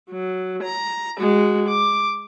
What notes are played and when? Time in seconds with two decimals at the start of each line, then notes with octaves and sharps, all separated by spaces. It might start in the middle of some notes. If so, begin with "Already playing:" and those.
0.10 F#3
0.63 A#5
1.19 G#3 F#4
1.68 D6